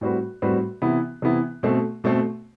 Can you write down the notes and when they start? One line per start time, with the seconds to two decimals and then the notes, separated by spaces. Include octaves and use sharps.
0.01 A2 G3 C4 F#4 B4
0.42 A2 G3 C4 F#4 B4
0.82 C3 E3 B3 E4
1.22 C3 E3 B3 E4
1.63 B2 A3 C4
2.04 B2 A3 C4